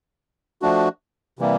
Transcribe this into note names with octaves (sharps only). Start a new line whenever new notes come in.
F3 A3 D4 F#4
C3 E3 G3 A#3